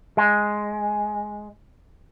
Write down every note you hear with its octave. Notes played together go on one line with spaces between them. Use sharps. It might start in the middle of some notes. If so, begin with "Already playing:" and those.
G#3